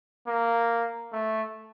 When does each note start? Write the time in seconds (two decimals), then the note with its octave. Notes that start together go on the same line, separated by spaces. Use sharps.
0.27 A#3
1.13 A3